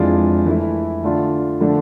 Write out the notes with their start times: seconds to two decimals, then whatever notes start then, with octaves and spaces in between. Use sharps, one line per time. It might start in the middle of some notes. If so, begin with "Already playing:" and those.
Already playing: F2 E3 G#3 D4 F4
0.46 E3 A3 E4
1.03 D3 A3 D4 F4
1.60 D3 F3 A3 D4